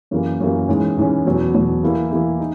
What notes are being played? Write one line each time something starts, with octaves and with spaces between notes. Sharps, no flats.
F#2 E3 A#3
F#2 E3 A#3
G#2 E3 G#3 C#4
G#2 E3 G#3 C#4
E2 B2 F#3 B3
E2 B2 F#3 B3
E3 A#3 E4
E3 A#3 E4
D#4